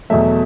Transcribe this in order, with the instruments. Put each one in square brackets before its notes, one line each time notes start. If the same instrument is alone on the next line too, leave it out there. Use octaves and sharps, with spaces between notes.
[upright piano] E2 B2 F#3 A3 E5